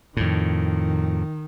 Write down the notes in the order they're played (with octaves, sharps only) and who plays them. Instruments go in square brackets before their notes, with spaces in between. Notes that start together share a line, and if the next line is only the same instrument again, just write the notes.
[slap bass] F2 A2 [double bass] D#3